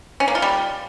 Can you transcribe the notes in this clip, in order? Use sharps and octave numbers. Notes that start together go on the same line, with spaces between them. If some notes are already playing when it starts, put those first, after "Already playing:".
C#4
A#3
F4
G3